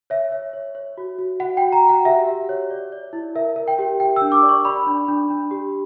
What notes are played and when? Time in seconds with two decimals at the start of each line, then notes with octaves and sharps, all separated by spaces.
0.10 C#5 E5
0.32 C#5
0.53 C#5
0.75 C#5
0.97 F#4
1.18 F#4
1.40 F#4 F#5
1.57 F#4 G5
1.72 A#5
1.84 F#4 F#5
2.05 G4 E5
2.27 G4
2.49 C#5
2.71 D5
2.92 D5
3.13 E4
3.35 A#4 E5
3.56 A#4
3.68 G5
3.79 G4
4.00 A#4 G5
4.16 E6
4.22 D4
4.32 D6
4.43 D5
4.49 C#6
4.65 D5 B5
4.86 D4
5.08 D4
5.30 D4
5.51 G4